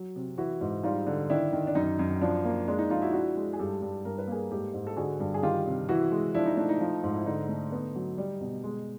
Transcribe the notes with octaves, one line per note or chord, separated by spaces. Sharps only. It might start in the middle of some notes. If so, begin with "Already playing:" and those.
Already playing: F#3
C3
E3 E4 F#4
G#2
G3 D#4 F4
D3
D#3 D4 E4
D#3
D4
F#2 D#4
F#2
F3 D4
A#3
G#3 D4
D#4
F3 D#4 F4
E4 F#4
D4 E4 F#4
G#3
G#4
G2 G4 A4
G2
G2 A#4
B4
A#3 G#4 A#4
G#2 G4 A4
G#2
A4
D3 F#4 G#4
G2
G#4
D#3 F4 G4
C3
E3 E4 F#4
G#3
F3 D4 E4
D#4
A3 D4
D#4
F3
G#2
E4
D3 D#4
A3
B3
F#3
G3
B2
G#3